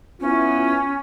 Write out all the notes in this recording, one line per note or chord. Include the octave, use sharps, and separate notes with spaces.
B3 C#4 E4 F4